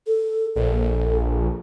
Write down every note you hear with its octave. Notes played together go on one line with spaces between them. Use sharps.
A4
A#1 A4